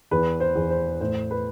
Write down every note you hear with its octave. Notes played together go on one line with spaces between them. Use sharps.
E2 B4
C5
E2
C5
A2 C5
B4